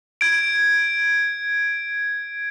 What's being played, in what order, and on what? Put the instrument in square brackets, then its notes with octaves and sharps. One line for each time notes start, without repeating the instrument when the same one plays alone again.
[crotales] G#6 D7